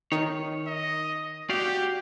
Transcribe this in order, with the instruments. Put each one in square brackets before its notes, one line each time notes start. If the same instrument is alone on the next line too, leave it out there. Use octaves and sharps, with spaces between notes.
[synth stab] D#3 [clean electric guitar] C#5
[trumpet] D#5
[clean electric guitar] F#4 D5 F5 [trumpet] G4